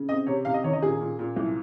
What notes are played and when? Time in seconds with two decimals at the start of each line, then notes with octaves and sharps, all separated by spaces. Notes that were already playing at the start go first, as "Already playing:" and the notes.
Already playing: C#3
0.09 C4 D#5
0.27 C3 C#5
0.45 C3 F5
0.54 D#5
0.63 D#3 C#5
0.73 D#5
0.82 A#2 G#4
1.01 A#2
1.19 A#2
1.36 C2